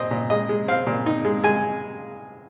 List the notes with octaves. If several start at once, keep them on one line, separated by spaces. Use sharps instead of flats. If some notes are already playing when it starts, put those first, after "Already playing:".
Already playing: A#2 C4 D#5
A#2
G#3 D#5
G#3
C4 F5
A#2
D#4
G#3
G#3 G#5